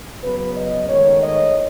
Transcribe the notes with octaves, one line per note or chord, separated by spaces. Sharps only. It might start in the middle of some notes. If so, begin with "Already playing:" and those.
C#3 F#3 B3 B4
D#5
G#2 D#3 A3 C#5
D#5